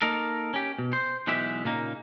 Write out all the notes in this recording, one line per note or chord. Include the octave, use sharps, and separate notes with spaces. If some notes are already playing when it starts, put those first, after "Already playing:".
A#3 D#4 A4 A#4
C#4 G4
B2
C5
B1 B2 E3 G#3 G4 E5
A#2 C#3 A#3 D#4